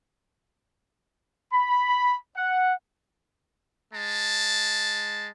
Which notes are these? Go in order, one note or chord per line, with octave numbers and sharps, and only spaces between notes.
B5
F#5
G#3 A5